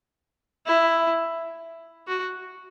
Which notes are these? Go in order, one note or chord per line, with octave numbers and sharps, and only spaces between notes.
E4
F#4